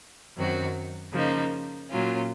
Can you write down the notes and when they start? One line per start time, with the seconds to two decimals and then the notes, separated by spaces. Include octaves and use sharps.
0.36 F#2 D#3 F#3 C4 F#4
1.12 C#3 F3 A#3 D#4
1.89 A#2 F#3 C#4 F4